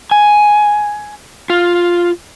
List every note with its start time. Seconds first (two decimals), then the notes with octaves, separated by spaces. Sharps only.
0.11 G#5
1.50 F4